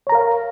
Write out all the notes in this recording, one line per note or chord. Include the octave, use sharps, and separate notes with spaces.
A#4 C#5 F5 A#5